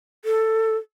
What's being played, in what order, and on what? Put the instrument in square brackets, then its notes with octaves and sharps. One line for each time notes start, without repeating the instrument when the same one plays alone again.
[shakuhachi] A4